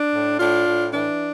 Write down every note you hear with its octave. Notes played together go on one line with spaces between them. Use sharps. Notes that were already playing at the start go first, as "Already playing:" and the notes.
Already playing: D4
A2
A2 D4 F4
A2
E3 D4